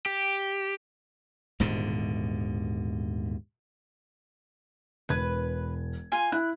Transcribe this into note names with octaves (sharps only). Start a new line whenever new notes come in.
G4
D#1 G#2 B2 D3
E1 B4 G#6
F4 G#5
E4 F#6